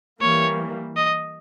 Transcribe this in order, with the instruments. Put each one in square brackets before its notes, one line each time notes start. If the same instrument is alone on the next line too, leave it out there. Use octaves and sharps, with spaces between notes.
[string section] E3 G3 A#3 [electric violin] C#5
[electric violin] D#5